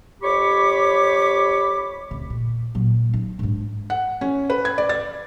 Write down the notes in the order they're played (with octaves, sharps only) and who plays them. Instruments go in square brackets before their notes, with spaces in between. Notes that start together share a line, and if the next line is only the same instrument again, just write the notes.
[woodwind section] F2 G4 C#5 B5 C#6 D6
[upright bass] D2 C3
A#2
A#2 F#3
D#4
G#2 D4
[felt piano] F#5
C#4
B4
G#6
D5
A6